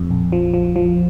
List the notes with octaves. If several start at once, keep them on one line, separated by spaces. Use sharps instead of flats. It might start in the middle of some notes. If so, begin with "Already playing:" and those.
Already playing: F2
A#1
F3
F3
F3